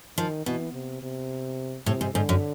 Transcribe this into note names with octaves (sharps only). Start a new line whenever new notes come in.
D#3 F3
B2 E3
C3
C3
A2 C3
G#2
G#2 D3
F#2